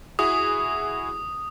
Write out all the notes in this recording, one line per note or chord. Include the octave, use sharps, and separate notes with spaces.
E4 F#4 G#4 D#6